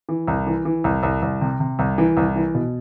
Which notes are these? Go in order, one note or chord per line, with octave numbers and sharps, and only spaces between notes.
E3
C2
E3
E3
C2
C2
C2
C3
C3
C2
E3
C2
E3
B2